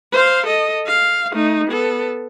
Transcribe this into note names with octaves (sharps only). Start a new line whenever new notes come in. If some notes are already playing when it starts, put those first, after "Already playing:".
C5 F5
A4 D#5
F5
A3 D#4
B3 A4